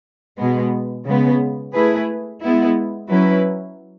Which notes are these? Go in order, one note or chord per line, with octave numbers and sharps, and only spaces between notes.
B2 G#3 B3
C#3 G#3 B3
A3 E4 G#4 B4
G#3 B3 E4
F#3 C#4 E4 B4